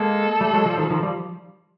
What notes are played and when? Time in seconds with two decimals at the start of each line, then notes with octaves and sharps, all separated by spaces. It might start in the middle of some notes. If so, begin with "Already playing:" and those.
Already playing: G#3 A#3 A4
0.41 G3 A3
0.53 F#3 G#3
0.65 F3 G3
0.77 D#3 F3
0.90 D#3 F3
1.03 F3 G3